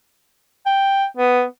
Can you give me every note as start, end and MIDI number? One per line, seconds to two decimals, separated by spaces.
0.66 1.05 79
1.17 1.44 59